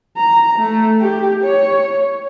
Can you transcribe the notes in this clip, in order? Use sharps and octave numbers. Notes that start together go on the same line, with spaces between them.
A#5
A3
G4
C#5